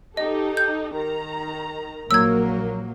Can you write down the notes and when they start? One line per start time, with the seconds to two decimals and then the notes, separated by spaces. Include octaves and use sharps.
0.17 D#4 G4 A4 D#5
0.57 G6
0.95 D#3 A#5
2.11 A#1 F#3 A#3 A#4 E6 G#6